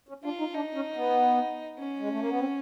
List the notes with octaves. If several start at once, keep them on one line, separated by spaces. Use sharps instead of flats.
C#4
D4 F4
D#4
D4 D#4
C#4
B3
C#4
G#3
A3
A#3
B3
C4